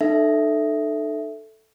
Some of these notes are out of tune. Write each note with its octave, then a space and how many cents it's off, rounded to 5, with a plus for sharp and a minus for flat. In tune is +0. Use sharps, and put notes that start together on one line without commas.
D#4 -45 A4 +0 E5 +0